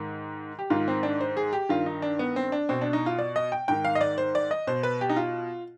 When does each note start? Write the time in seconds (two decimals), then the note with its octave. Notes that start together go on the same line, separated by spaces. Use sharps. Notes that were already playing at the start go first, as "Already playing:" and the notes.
Already playing: G#2 D#3
0.59 G4
0.70 G#2 D#3 F4
0.88 C4
1.03 D4
1.21 C5
1.37 G#4
1.53 G4
1.69 G2 D#3 F4
1.86 D#4
2.02 D4
2.19 B3
2.36 C4
2.52 D4
2.69 B2 C4
2.82 D4
2.93 D#4
3.06 F4
3.19 D5
3.36 D#5
3.52 G5
3.68 G#2 D#3 G5
3.85 F5
3.95 D#5
4.01 D5
4.18 C5
4.35 D5
4.51 D#5
4.67 B2 C5
4.83 B4
5.01 G4
5.10 D#4
5.16 F4